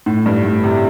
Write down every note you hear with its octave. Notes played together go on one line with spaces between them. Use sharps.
A2
G2
A2
C3